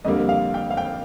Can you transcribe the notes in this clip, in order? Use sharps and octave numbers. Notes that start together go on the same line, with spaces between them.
F2 D3 G3 A#3 D#5
F5
G5
F5
G5